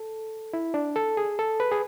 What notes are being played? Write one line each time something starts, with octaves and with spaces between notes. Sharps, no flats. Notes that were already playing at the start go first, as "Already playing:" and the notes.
Already playing: A4
E4
D4
A4
G#4
A4
B4
G#4